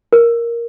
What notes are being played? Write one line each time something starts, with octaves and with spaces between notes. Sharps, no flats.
A#4